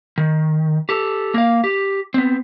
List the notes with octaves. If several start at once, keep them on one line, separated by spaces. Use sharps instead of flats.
D#3
G4 A4
A#3 F5
G4
B3 C4